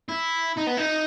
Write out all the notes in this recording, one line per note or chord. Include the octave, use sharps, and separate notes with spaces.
E4
D#4
B3
D#4